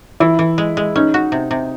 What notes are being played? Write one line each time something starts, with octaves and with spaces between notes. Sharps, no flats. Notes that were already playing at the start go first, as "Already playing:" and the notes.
E3 E4
E3
G#3
G#3
C#4 D#4
F#4
C3
C3